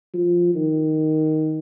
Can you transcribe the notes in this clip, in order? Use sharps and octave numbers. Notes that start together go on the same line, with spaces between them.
F3
D#3